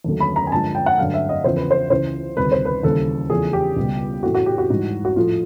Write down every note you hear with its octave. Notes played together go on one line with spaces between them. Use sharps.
D#2 D3 F#3 A3
B5
A#5
G#5
G2 D3 F3 G#3 A5
G5
F#5
G2 D3 F#3 A3 F5
E5
D#5
E2 C#3 F3 C5
B4
C5
C#2 C#3 E3 C5
D2 C3 D#3 G3 B4
C5
B4
D#2 C#3 E3 G3 A4
E2 C#3 F3 A3 G#4
G4
C#2 B2 G3
A2 E3 A3 F#4
F#4
G4
F#4
G#2 E3 G3
F#4
A2 F3 A3 F4